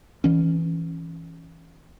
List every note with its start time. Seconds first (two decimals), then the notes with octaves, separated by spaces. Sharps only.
0.24 E3 C#4